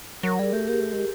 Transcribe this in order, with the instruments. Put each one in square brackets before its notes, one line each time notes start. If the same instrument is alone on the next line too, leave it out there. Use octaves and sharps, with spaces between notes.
[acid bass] F#3 [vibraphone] A#4
[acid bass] G3 [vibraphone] G#4
[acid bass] A3 [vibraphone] G4
[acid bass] A#3 [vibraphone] G4
[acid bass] A3
G#3